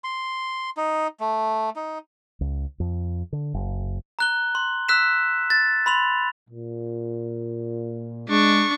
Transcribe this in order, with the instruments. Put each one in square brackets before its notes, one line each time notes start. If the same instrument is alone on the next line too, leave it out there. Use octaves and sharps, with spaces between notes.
[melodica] C6
D#4
A3
D#4
[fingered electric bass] C#2
F2
D3
F#1
[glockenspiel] A#5 F#6 G7
C6
E6 F#6 B6 E7
A6
B5 C6 F7
[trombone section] A#2
[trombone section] G#3 [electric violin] D4 C#6